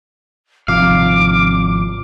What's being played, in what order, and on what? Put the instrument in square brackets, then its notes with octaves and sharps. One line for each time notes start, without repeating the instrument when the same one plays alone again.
[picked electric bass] G#1 C3 F3 [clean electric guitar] F5 [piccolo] D6